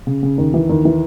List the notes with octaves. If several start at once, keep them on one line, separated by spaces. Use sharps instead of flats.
C#3
C#3
D#2
E3
D#2
E3